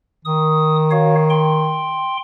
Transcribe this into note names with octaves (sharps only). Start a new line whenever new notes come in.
D#3 D#6
F#4 C#5 F5
G5 C6